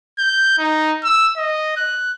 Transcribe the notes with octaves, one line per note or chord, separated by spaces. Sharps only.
G6
D#4
E6
D#5
F#6